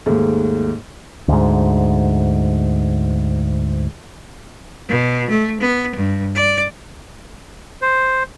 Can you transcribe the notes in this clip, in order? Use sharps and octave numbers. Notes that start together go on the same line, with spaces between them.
D#2 G#2 A3
D2 G#2
B2
A3
B3
G2
D5
C5